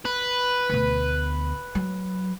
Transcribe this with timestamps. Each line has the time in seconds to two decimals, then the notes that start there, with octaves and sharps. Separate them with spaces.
0.05 B4
0.70 D2 B2
1.75 F#3